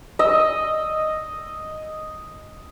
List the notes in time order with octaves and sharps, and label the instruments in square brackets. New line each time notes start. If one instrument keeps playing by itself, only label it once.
[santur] D#5 E6